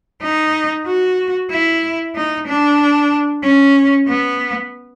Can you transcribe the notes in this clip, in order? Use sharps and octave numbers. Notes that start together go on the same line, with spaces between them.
D#4
F#4
E4
D#4
D4
C#4
B3